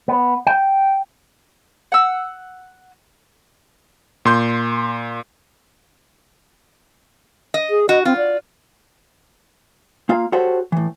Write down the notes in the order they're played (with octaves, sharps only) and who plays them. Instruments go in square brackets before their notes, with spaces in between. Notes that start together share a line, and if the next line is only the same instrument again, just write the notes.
[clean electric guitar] B3
G5
[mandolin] F#5 E6
[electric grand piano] A#2 C6 G6
[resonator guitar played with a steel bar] D#5
[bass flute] G#4
[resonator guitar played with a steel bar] F#4 [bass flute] D#5
[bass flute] C4 [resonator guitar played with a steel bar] F4
[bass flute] D5
[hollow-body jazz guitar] A#3 F4 F5
F#4 G4 A4 C5 C#5 F#5
A2 E3